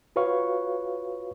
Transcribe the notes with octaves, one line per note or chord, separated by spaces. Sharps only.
F4 F#4 B4 C#5 F5 C#6